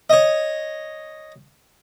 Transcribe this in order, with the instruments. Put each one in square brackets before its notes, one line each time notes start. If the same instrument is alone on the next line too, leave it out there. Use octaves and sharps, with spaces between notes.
[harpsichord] C#5 D#5